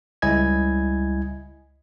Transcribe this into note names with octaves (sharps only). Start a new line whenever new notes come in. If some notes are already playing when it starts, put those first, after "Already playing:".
C#2 G3 E4 D#5 G#5 G#6